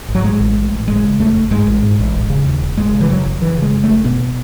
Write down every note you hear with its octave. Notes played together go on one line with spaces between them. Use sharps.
G#1
F#3
A2 G#3
A1
A2
A1
F#1 G#3
C#3
E2 A3
F#1
G#2 G#3
A1
G#2
A1
E1
C#3
D#2
E1
F#1 G#3
C#3
E3
F#2 F#3
F#1
F#1 E3
C#3 G#3
F#2
A3
F#1
B2 B3